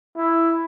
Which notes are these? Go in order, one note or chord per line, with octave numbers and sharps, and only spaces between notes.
E4